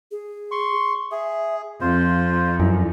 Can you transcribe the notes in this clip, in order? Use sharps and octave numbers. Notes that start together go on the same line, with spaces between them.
G#4
C6 C#6
G#4 E5
F2 C4 F4 C5
F#2 E4